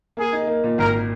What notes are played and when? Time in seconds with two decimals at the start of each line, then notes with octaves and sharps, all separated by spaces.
0.17 A#3 G#4
0.33 D#4
0.47 A#3
0.64 A#2
0.78 G#1 A#4